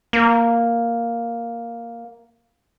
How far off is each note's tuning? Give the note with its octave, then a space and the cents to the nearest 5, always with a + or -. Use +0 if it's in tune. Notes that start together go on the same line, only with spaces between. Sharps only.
A#3 +0